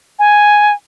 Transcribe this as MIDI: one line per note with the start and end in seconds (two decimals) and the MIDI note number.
0.19 0.73 80